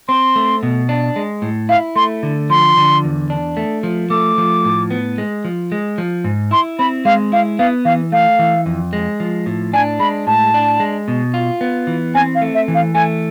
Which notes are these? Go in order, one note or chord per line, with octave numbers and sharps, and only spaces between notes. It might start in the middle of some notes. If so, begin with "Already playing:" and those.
C4 C6
A3
B2
D4
G#3
A2
E4 F5
A3 C6
D3
F3 C6
D3
E2
D4
A3
F3
A3 D6
F3
A2
B3
G#3
F3
G#3
F3
G#2
E4 C6
C4 B5
G#3 F5
E4 F5
B3 F5
E3 F5
A3 F5
E3
F2
G#3
F3
A2
D4 G#5
G#3 B5
A2 A5
D4
G#3
B2
F4
B3
E3
C4 G#5
F5
A3
E5
E3
F5
A3 G#5